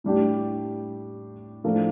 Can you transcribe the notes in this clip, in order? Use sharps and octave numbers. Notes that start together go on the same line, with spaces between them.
A2 G3 D4 G4
A2 F3 A#3 D4 A4